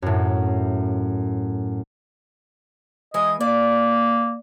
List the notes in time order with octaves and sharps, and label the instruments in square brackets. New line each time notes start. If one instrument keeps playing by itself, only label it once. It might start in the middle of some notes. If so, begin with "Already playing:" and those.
[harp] F#2 A2
[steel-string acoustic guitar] E3 G#3 G#5 [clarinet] D#5
[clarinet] A#3 [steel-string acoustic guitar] D5